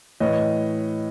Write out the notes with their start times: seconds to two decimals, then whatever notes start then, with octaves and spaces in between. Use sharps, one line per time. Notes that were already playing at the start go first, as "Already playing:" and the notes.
0.20 A2 E3 C#5 D#5